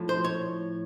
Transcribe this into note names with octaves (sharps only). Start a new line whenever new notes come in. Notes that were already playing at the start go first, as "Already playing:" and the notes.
Already playing: A2 F3
C5
C#5